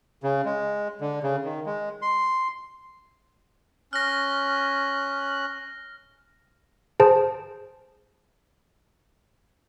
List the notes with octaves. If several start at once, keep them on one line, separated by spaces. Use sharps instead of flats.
C#3
G#3
D3
C#3
D#3
G#3
C6
C#4 F6 F#6 A#6
G#4 C5 A5